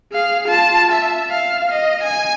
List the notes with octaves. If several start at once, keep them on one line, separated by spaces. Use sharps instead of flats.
G#4 F5
F4 A5
E5
F5
D#5
G#5